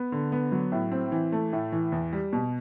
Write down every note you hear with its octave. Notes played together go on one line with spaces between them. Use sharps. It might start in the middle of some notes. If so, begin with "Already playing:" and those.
Already playing: B3
D3
B3
F#3
A2
C4
E3
A3
A2
E3
E2
G3
B2